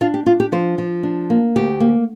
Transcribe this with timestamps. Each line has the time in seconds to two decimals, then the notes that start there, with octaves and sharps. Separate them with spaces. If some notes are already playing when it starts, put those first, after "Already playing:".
0.01 D4 F4
0.14 G4
0.26 D4 F4
0.40 G4
0.52 F3 C5
0.78 F3
1.03 D4
1.30 A#3
1.56 D2 G4
1.80 A#3